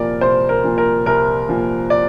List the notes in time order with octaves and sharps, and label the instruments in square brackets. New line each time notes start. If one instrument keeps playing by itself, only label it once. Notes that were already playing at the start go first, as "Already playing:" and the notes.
Already playing: [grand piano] C2 A#2 F3 A#4 D5
C2 C5
A#4
A#2 F3
A#4
C2 A#4
A#2 F3
D5